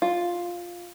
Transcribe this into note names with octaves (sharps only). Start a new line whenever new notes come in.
F4